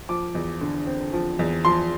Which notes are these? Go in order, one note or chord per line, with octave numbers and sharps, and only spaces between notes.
F3 D6
E2
D3
C4
F3
E2
F3 C6